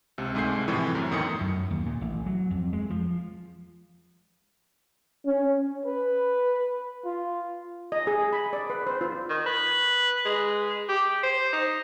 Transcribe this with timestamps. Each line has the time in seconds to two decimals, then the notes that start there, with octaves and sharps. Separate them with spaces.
0.18 C#2 C3
0.35 C2 G#2 A3 G#5 G6 C7
0.68 A2 C3 E3 F3 G3
0.95 F#2
1.11 E2 A2 D#3 D#6 C#7
1.41 F#2
1.71 D#2
1.86 A#2
2.01 A1
2.26 F#3
2.50 F2
2.73 G#3
2.90 F3
5.26 C#4
5.86 B4
7.05 F4
7.92 D#5
8.07 G#4
8.33 B5
8.53 D5
8.70 B4
8.87 C5
9.01 F4
9.29 D#3
9.46 B4
10.25 G#3
10.89 G4
11.23 C5
11.53 D#4